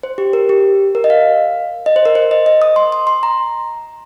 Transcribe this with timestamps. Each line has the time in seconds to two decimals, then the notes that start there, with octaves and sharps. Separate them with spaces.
0.03 C5
0.18 G4
0.33 A#4
0.49 G4
0.95 A#4
1.04 D#5
1.10 F5
1.86 D#5
1.96 C5
2.05 A#4
2.15 C5
2.31 D#5
2.46 D#5
2.62 D#6
2.76 C6
2.92 C6
3.07 C6
3.23 A#5